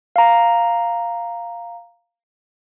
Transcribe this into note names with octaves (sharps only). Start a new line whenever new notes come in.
F5 A#5